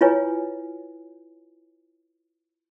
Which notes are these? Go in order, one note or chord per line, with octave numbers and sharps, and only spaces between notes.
E4 F4 B4 C#5 G#5